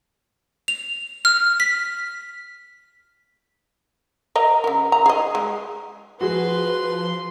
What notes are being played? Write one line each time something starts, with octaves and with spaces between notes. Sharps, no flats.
F7
F6
B6
A#4 D#5 A#5
C#3 A#4
A#5
G#4 D#5
G#3
F3 F#4 G#4 B4 C6